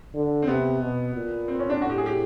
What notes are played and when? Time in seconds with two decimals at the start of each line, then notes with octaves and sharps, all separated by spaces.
0.14 D3
0.42 C4
0.47 C3 B3
0.81 B2
1.15 A#2
1.48 C4
1.59 C#4
1.70 D4
1.81 A2 F#4
1.90 G4
1.98 G#4
2.06 G4